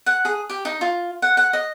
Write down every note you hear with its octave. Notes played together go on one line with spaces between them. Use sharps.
F#5
G#4
G4
D#4
F4
F#5
F#5
D#5